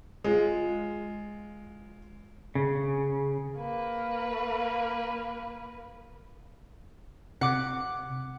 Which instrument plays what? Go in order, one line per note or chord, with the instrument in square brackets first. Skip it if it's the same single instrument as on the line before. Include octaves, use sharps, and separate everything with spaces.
[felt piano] G#3 F4
[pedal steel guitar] C#3
[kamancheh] A#3 B4
[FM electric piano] C3 [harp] F#5 D6